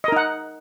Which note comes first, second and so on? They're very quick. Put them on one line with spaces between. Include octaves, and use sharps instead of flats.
D#5 A#4 D#4 F#5